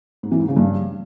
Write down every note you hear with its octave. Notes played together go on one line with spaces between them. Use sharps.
G#2
E3
G#2
C#3
G2